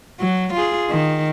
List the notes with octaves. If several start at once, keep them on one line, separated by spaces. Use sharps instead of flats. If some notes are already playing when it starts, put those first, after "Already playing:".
F#3
F4 G#4
D#3